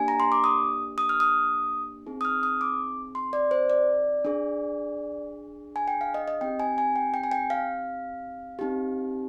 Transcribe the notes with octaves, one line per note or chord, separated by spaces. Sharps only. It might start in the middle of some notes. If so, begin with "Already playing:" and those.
Already playing: A#3 D4 G4 G#5
A#5
C6
D6
D#6
D#6
F6
D#6
C4 D#4 G#4
D#6
F6
D#6
D6
C6
D5
C5
D5
D4 G#4
G#5
G5
F5
D#5
D#5
C4 D#4 G4 G5
G#5
G#5
G5
G5
G#5
G5
F5
C4 D#4 G4